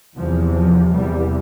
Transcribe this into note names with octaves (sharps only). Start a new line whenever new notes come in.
E2 C3 F3
F3
E2 C3 G3